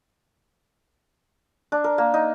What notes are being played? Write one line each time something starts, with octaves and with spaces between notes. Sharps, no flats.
D4
A#4
A#3
D#4